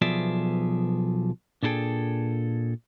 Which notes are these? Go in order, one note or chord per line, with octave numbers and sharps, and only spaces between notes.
B1 F3 B3 G#4 D5 E5
A#2 D4 E4 G#4 A4 G5